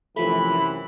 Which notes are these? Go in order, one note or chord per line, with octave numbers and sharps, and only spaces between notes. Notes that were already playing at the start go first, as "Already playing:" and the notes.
F#2 C3 E3 F3 A3 B5